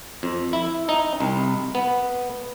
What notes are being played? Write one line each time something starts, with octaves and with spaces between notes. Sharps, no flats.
F2
E4
D#4
C2
B3